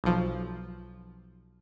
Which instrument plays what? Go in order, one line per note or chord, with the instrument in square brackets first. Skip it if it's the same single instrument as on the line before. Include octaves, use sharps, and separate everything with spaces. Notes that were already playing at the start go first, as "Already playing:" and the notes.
[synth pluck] B1 F3